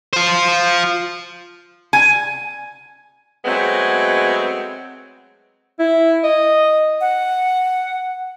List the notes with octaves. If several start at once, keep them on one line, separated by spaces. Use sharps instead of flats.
F4 C5
G#5
F#3 G#3 A3 B3 C4
E4
D#5
F#5